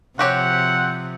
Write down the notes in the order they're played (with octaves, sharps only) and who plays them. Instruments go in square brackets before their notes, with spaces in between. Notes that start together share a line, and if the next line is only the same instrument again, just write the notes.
[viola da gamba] C3 F3 [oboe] C4 [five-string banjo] F#4 G4 C#5 [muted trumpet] F#5